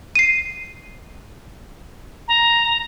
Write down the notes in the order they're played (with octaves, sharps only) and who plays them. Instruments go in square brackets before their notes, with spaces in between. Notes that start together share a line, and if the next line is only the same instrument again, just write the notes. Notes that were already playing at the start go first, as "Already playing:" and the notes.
[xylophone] C7 D#7
[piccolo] A#5